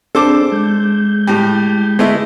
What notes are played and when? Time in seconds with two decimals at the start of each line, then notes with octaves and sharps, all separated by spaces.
0.15 C4 D4 G#4 A4 C5 D6
0.52 G#3 G6
1.27 A2 G3
1.99 G#3 A3 B3 E4 G#4